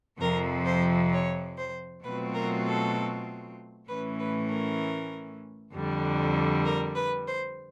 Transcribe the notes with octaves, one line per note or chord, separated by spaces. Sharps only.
F2 C3 F3 A#4
C5
C#5
C5
B2 F#3 A3 C4 F4 B4
A#4
A4
A2 E3 A3 C#4 B4
B4
A#4
F2 D3 G3
A#4
B4
C5